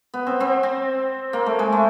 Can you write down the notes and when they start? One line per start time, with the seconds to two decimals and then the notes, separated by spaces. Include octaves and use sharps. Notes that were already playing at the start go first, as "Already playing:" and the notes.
0.14 B3
0.27 C4
0.40 C4
0.63 C4
1.33 A#3
1.46 A3
1.59 G#3
1.72 A3